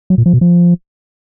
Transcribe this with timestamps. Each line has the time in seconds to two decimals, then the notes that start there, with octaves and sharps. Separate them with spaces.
0.10 F#3
0.18 A#2
0.26 F3
0.33 B2
0.41 F3